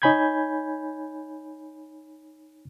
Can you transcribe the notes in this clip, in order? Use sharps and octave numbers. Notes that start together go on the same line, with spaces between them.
D#4 C#5 G#5 B5 G6 G#6